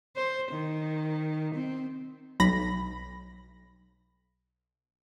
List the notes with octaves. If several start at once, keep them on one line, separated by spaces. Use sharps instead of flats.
C5
D#3
C4
B1 B5 A#6